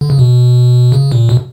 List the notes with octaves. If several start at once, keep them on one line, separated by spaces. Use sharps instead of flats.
D3
C#3
B2
C#3
A#2
B2